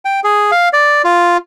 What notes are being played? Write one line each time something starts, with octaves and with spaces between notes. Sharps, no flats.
G5
G#4
F5
D5
F4